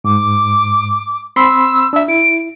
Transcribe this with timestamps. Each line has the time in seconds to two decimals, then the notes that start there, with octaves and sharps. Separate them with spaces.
0.04 G#2 D6
1.36 C4 B5 C6 E6
1.93 D4 E5 E6
2.08 E4 D7